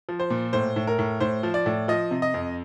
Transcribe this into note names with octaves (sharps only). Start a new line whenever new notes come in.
F3
C5
A#2
A2 C5
A2
A#4
A2
A2 C5
F3
D5
A2
F3 D#5
C3
D#5
F2